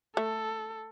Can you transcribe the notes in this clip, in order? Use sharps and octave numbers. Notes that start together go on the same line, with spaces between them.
A3 A4